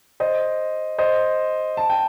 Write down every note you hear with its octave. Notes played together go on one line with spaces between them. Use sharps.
C5 D#5
C5 D#5
A5
G5